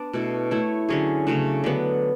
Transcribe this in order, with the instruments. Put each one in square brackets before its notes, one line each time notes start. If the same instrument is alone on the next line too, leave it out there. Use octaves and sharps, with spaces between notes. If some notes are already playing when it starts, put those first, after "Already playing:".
Already playing: [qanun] B3 D4 D5
B2 A3 E4 A4
A3 E4 A4 C#5
D3 F#3 C#4 G#4
C#3 F#3 A3 D4
D3 F#3 B3